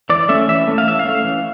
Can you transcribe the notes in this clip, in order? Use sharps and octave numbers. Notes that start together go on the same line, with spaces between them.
E3 D5
A3 C#4 E5
E3 E5
A3 C#4
F5
E3 E5
F5
A3 C#4
E3